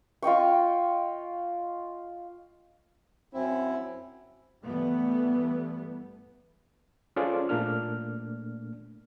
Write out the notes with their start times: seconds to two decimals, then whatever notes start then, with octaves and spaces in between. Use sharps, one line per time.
0.22 F4 D#5 G5 C#6
3.34 F#2 C4 E4
4.64 G2 E3 G3 A3 B3
7.16 C#4 F4 G#4 A4 C5 D5
7.49 A#2 A3 A#3 D4 F6